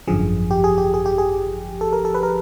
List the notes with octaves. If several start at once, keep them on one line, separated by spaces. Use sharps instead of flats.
G#1 F#2 D3 F3 G#4
G4
G#4
G4
G#4
G4
G#4
A4
A#4
A4
B4
A#4